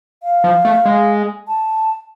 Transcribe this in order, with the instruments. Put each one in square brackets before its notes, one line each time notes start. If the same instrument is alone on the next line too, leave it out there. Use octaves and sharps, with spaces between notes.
[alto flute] F5
[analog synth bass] F3
A3
G#3
[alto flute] A5